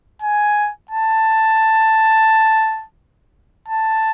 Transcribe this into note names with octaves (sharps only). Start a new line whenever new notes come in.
G#5
A5
A5